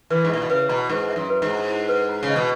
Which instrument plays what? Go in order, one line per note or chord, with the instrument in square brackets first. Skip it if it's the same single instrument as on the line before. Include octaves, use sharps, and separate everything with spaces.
[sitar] E3 [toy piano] B4
[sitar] G#2
[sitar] A#2 [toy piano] E5
[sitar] B2
[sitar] C#3 [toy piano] B4
[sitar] B2 [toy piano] A#5
[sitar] G#2 [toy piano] B4
[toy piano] E5
[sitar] F#2
[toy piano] B4
[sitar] G#2
[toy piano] A#5
E4
B4
A#5
[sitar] C#3
[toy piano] D#5
[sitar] B2